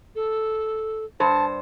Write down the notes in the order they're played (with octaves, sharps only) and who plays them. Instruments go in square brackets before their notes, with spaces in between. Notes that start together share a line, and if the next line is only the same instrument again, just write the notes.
[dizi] A4
[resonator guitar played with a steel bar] G2 C5 [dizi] A5